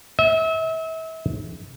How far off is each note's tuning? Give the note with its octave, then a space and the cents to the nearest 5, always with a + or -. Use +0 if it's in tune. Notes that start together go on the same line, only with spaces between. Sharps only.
E5 -35